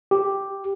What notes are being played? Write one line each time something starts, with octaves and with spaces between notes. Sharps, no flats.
G4